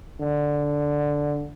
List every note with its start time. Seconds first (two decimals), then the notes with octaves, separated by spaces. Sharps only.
0.20 D3